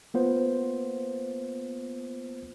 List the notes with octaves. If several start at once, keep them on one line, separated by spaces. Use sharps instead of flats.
A#3 B3 F4 C5